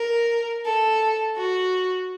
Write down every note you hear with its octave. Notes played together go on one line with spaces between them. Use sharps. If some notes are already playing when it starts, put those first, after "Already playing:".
Already playing: A#4
A4
F#4